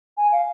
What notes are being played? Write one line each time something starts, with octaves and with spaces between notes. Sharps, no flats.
G#5
F5